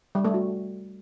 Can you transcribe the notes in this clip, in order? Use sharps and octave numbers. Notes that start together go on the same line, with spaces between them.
G3
A3
F#4